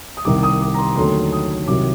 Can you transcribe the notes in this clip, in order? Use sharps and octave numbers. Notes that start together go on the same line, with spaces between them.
D#6
C2 C3 D#3 G3 D6
D#6
D6
A#5
C6
D#2 D3 F#3 A3 C6
D#6
C2 C3 D#3 F#3 D6